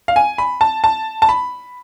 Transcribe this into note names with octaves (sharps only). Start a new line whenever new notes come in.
F5
G#5
B5
A5
A5
A5
B5